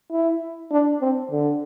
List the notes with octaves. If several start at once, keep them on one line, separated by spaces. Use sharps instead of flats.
E4
D4
C4
D3